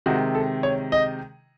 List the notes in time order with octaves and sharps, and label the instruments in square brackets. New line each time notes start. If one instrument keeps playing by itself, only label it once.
[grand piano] C3 D#3 G#3 F#4
A4
C#5
D#5